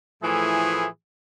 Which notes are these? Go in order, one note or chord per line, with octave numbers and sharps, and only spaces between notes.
A2 E3 F3 A3 E4 G#4